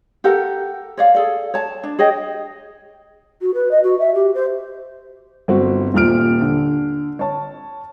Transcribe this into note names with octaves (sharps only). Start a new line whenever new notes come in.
G4 A4 A#4 F#5
C#5 D5 F5
G#4 A4 D5
C#5 A5
D4
G#4 C#5 D#5 G5
F#4
B4
D#5
F#4
E5
G4
C5
G1 C4 F#4
D#1 A#2 F6 D7
D3
C#5 A5